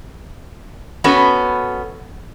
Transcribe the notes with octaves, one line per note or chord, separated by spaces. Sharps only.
B3 C#4 F#4 A4